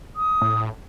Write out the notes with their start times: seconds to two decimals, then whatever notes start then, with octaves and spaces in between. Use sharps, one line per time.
0.16 D#6
0.41 A2